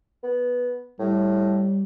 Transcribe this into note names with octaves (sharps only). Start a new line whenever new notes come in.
B3
A2 G3